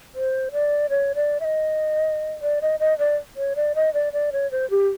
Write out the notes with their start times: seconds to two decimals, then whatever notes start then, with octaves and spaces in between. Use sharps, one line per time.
0.15 C5
0.52 D5
0.90 C#5
1.15 D5
1.40 E5
1.45 D#5
2.42 D5
2.62 D#5
2.80 D#5
2.99 D5
3.36 C#5
3.56 D5
3.75 D#5
3.94 D5
4.13 D5
4.32 C#5
4.51 C5
4.70 G4